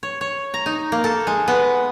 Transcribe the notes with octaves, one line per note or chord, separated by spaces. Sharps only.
C#5
C#5
A#5
D#4
A#3
A4
G#3
B3